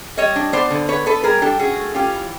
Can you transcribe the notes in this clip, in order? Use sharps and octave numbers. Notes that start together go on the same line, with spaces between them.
G3 C#5 D#5
D4
B3 C5 D5
D3
B3 B4 C#5
B3 A4 B4
G3 G#4 A#4
D4 G4 A4
C#4 F#4 G#4
A3
C#4 F4 G4
E3